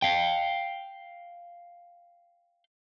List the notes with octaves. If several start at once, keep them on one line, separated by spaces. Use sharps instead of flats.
F5 G5